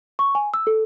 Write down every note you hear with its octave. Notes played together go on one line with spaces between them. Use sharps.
C#6
G#5
E6
A4